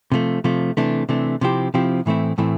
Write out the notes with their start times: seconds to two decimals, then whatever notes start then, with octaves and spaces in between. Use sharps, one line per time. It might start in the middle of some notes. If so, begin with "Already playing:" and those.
0.12 C3 F3 A3
0.44 C3 F3 A3
0.77 C3 E3 A3 D4
1.09 C3 E3 A3 D4
1.41 C3 F3 C4 E4 G4
1.74 C3 F3 C4 E4 G4
2.06 A2 E3 A3 C4 E4
2.38 A2 E3 A3 C4 E4